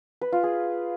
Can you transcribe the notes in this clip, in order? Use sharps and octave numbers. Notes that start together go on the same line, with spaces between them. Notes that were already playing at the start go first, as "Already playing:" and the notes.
B4
F4
G#4